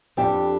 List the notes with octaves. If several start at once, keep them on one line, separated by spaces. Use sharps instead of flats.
F2 D3 G3 D4 G4 G5